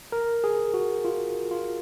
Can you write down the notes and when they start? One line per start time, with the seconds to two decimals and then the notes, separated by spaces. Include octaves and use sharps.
0.12 A#4
0.44 G#4
0.74 F#4
1.05 F4
1.51 F4